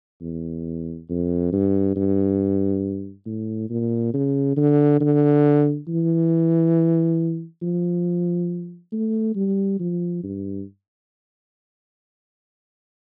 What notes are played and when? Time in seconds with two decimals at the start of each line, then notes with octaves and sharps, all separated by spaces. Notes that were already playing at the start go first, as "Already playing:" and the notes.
0.22 E2
1.09 F2
1.52 G2
1.96 G2
3.26 A2
3.70 A#2
4.13 C#3
4.57 D3
5.00 D3
5.88 E3
7.62 F3
8.92 A3
9.35 G3
9.79 F3
10.23 G2